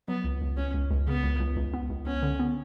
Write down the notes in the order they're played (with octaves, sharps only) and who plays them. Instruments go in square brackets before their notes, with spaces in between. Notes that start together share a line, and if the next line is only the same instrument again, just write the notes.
[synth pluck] F#3 [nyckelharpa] B3
[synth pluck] C#2
C#2
[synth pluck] C#2 [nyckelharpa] C#4
[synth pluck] C#2
C#2
[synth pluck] C#3 [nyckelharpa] B3
[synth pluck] C#2
C#2
C#2
B3
C#2
[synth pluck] B3 [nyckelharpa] C#4
[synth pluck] D3
B3